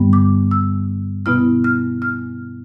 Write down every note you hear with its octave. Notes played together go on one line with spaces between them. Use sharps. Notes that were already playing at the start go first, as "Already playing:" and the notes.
Already playing: G2 D3 G3 B3
D6
E6
B2 B3 E4 F6
F6
F6